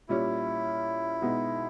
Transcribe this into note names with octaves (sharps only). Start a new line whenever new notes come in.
A#2 G3 C#4 E4
B2 G#3 B3 D#4